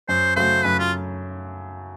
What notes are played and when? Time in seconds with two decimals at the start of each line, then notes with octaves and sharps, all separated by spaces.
0.09 F#2 C5
0.36 C#3 F#3 A3 C5
0.64 F#2 B4
0.79 F4